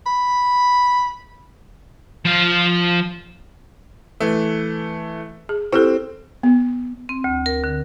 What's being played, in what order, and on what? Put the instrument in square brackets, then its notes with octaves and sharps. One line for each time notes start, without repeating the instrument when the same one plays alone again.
[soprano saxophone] B5
[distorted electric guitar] F3 F5
[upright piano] E3 A3
[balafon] G#4
[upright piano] C4 [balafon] E4 G4 A4
[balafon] B3
[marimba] C4
D2
A#4
D3